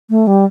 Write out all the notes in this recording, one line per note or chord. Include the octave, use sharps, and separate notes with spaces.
A3
G3